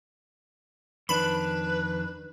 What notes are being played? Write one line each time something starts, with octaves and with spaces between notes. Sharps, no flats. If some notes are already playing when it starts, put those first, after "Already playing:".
F2 D#3 D4 B4 B5